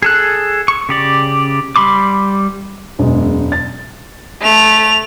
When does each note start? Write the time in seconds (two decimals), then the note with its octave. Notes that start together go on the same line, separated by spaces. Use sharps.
0.02 G#4 A4 F#6
0.68 C#6
0.89 C#3 G4 D5
1.76 G3 B5 C6 D6
2.99 E1 F#2 G#3
3.52 A6
4.41 A3 F7